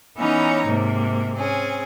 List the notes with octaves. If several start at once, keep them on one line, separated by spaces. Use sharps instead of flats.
E3 B3 C#4 D#4 C#5 A#5
G#2 C3 A#3
C4 C#4 G#4